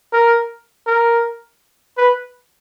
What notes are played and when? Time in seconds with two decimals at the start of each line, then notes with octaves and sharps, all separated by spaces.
0.13 A#4
0.87 A#4
1.98 B4